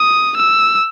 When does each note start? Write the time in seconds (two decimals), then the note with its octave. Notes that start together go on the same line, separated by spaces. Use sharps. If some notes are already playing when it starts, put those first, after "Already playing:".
Already playing: D#6
0.37 E6